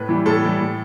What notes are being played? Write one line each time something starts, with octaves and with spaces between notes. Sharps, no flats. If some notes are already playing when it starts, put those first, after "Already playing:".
Already playing: A2 B4
E3 G3
A2 A4
E3 G3
A2